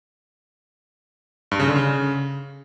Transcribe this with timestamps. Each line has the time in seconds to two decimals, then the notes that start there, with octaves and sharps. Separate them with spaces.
1.51 G2
1.60 C#3
1.68 D3
1.76 C#3